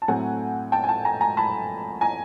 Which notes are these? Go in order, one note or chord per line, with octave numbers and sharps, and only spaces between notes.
A5
A2 F#3 A3 C4 F#5 G#5
G5 A5
G#5
G5 A5
G#5 A#5
G#5 A#5
A5 B5
G#5 A#5